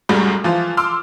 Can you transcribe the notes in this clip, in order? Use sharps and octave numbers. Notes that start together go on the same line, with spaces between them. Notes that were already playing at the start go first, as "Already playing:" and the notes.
C2 F#2 A2 G3 G#3
E3 F3 F4
C6 D6 E6 F6